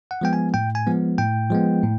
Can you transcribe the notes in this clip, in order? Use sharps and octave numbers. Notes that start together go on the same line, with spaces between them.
F#5
F3 G#3 B3 G5
G#5
A2 G5
G#5
F3 G#3 B3
A2 G5
F3 G#3 B3
A2